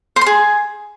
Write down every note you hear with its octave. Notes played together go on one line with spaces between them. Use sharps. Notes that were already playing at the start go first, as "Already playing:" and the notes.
C5
C6
G#4